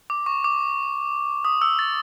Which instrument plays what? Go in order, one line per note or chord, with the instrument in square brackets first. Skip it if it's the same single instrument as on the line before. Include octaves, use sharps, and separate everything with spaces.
[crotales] D6
C#6
D6
D#6
E6
A6